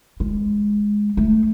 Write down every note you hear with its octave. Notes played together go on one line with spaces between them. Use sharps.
G#3
A3